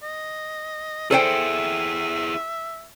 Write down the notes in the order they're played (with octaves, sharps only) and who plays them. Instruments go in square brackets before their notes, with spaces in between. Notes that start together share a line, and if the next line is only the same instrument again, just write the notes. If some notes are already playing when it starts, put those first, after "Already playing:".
[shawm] D#5
[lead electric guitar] E4 G#4 [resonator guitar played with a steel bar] A4 C5 G5 [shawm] E5